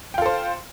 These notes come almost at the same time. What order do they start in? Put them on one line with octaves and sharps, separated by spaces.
G5 F4 A4 C5